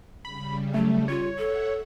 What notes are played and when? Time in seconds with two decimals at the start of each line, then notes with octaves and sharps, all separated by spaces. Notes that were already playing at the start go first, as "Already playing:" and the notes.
0.25 C#3 G3 B5
0.74 F#3 A3
1.08 F4 C#5
1.38 A4 E5 F#5